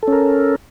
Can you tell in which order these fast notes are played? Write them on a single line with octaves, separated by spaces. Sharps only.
A4 C#4 A#4